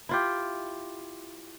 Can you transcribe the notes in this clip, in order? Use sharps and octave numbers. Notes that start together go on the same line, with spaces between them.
E4 F4 G4